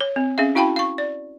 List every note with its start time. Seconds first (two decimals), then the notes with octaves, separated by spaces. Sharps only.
0.01 C#5
0.16 C4
0.38 C#4 G#4 E5 F5
0.55 E4 F#4 F5 G5 A5 B5
0.76 F5 C#6
0.98 D5